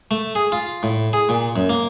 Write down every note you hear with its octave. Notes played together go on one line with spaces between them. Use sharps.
A3
G#4
F4
A2
G#4
A#2
F#2
A#3